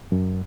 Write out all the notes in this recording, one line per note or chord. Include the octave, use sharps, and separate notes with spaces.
F#2